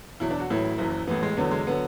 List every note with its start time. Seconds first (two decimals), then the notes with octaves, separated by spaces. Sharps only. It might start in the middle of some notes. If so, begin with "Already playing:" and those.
0.20 E2 B2 F#3 E4
0.31 D4
0.40 F#4
0.50 A1 A2 F#3 E4
0.78 F#1 F#2 E3
1.07 A1 A2 E3 B3
1.23 G#3
1.37 E2 D3 F#3 B3
1.51 G#3
1.67 D3 F#3 B3